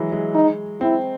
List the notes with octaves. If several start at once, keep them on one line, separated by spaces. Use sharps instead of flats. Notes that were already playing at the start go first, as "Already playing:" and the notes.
Already playing: E3 F#3 G#3
G#3
D#4
C4 E4